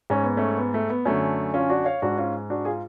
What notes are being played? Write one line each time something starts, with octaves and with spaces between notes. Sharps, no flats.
G#2 C#4
B3
A3 C#4
B3
A3
B3
F#2 D3 A3 C#4
C#4 F4
D4 F#4
C#5 F5
G#2 D4 F#4
C#4 F4
D4 F#4
F4 G#4